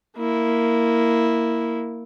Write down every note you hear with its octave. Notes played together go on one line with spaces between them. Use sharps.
A#3 E4